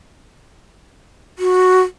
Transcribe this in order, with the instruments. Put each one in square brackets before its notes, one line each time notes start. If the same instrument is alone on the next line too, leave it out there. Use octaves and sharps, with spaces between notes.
[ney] F#4